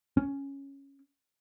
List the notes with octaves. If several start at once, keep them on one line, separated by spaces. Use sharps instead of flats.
C#4